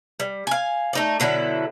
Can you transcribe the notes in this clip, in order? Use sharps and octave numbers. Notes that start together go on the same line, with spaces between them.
G3
F5 G#5
A3 D#4 D5
B2 D3 F#3 E4